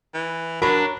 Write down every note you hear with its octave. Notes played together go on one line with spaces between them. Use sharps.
E3
F#3 D4 A#4 C#5 B5